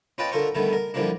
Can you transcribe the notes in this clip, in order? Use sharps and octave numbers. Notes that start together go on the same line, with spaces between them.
C#4 F4 B4 D#5 G5 A5
D3 F4 A4 A#4 C5 C#6
D3 D#3 G3 A3 B3
A#4
D3 E3 F3 G3 A#3 D4